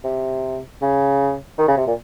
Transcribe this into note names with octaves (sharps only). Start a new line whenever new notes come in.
C3
C#3
D#3
C#3
C3
A#2